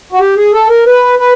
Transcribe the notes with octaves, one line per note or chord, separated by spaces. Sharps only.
F#4
G4
G#4
A4
A#4
B4
B4